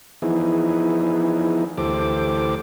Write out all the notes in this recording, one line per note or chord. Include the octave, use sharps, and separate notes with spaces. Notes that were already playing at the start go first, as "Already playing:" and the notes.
E3 F3 B3 D#4 E4 G#4
D2 E3 G4 A4 C5 D6